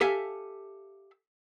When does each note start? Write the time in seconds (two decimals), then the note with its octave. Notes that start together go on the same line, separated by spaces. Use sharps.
0.01 G4 A4 E5 F5 G#5 A5